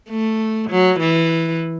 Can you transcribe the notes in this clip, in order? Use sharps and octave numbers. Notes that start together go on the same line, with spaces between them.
A3
F#3
E3